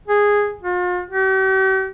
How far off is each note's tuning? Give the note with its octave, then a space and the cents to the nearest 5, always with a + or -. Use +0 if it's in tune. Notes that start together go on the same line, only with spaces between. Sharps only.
G#4 -10
F4 +40
G4 -45